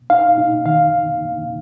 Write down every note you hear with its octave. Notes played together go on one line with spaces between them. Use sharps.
D#4 F5
D#4
D#3 F5